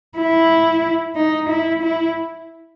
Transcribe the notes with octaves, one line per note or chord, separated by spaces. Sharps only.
E4
D#4
E4
E4